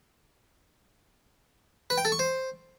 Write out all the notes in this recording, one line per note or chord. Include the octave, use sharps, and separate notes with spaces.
B4
G5
A4
C#6
C5